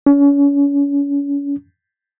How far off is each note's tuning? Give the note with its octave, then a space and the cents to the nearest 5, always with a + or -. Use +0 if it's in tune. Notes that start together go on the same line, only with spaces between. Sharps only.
C#4 +35